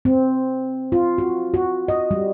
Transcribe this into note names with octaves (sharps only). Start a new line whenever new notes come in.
C4
F4
F#4
F#4
D#5
G3